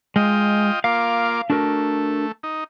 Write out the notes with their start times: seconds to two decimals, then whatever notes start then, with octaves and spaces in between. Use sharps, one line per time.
0.16 G#3 F4 D#5 G5
0.84 A#3 F4 F5 D6
1.50 A3 D4 F#4 A#4
2.43 D#4